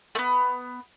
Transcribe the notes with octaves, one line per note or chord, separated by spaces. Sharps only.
A3 B3